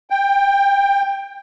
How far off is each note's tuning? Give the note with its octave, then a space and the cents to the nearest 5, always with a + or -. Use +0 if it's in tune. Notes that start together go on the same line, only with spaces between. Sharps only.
G5 +10